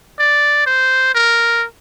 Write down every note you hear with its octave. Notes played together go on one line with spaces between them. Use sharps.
D5
C5
A#4